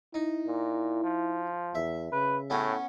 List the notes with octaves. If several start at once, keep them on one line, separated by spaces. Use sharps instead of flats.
D#4 E4
A#2
F3
E2 E5
C#3 B4
A2 B3 C#4 F#4